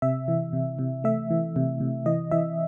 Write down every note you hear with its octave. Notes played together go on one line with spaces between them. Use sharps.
C3 E5
E3
C3
C3
A3 E5
E3
C3
C3
E3 D#5
E3 E5